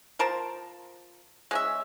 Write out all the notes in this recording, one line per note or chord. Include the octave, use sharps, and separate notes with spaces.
F3 A#4 C5 A5
G#3 C#4 E5